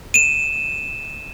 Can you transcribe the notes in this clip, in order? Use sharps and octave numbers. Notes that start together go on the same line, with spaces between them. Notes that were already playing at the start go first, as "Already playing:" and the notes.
D#7 E7